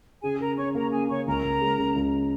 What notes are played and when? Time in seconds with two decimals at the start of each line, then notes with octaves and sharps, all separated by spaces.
0.23 C#3 G#4 G#5
0.40 C#3 A#4 A#5
0.57 C#4 C#5 C#6
0.75 A#3 A#4 A#5
0.92 C#3 G#4 G#5
1.09 C#3 C#5 C#6
1.26 C#2 A#4 A#5
1.43 C#2
1.61 G#3
1.78 C#3
1.95 C#2